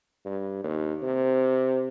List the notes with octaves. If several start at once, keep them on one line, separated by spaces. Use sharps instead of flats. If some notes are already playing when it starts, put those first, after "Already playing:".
G2
D#2
C3